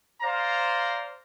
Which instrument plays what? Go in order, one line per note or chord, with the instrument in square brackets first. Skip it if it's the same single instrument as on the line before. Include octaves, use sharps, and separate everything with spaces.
[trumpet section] C5 D5 F5 A#5